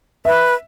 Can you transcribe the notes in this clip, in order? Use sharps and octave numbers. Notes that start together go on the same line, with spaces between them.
B4 E5